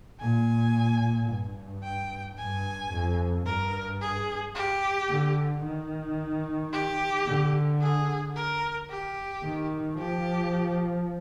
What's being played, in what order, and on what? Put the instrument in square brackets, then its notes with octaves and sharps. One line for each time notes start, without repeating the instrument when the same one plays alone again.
[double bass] A#2 [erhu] G#5
[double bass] G2
[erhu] G5
[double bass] G2 [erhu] G#5
[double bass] F2
[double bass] G2 [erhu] A#4
[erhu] G#4
G4
[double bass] D3
D#3
[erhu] G4
[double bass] D3
[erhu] G#4
A#4
G4
[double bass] D#3
[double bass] F3 [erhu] G4